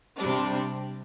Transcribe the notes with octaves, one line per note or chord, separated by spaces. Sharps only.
C3 G3 D4